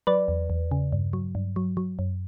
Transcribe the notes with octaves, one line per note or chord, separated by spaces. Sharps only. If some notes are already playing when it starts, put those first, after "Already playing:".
F#3 B4 D5
E2
E2
C#3
G2
F#3
G2
F#3
F#3
F#2